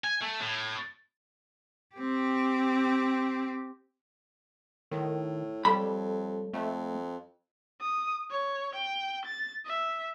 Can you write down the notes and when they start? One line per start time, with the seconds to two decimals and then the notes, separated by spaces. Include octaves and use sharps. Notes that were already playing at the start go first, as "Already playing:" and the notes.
0.04 G#5
0.22 A3
0.42 A2
1.95 C4 G4
4.91 A2 D#3
5.65 F2 G3 A4 C#5 B5
6.53 F2 A3
7.81 D#6
8.31 C#5
8.75 G5
9.25 A6
9.66 E5